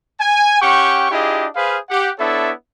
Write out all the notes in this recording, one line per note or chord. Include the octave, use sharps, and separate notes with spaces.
G#5
C#4 G4 F#5 G5 C#6
D4 E4 F4 G4 G#4 D#5
G#4 B4 C5 F5
G4 F#5
B3 D4 E4 A4 C#5 E5